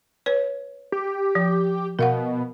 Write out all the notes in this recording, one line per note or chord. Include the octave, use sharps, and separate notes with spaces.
B4 C#5
G4
F3
B2 A#4 F5 F#5